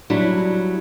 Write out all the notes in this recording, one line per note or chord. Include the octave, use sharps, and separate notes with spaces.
F#3 G3 D4 E4